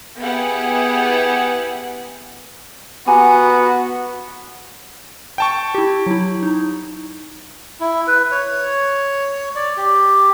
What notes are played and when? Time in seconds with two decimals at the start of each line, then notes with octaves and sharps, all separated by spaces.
0.19 B3 E4 G4 G#4 F#5
3.07 B3 F#4 G4 G#5 A#5
5.38 G5 A5 C#6
5.75 E4 G4
6.06 F#3 E4
6.43 D#4
7.80 E4
8.07 B4
8.31 C#5
9.56 D5
9.77 G4